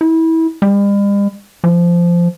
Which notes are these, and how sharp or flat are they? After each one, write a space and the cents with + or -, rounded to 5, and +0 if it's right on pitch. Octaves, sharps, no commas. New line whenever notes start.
E4 -25
G3 +45
F3 -15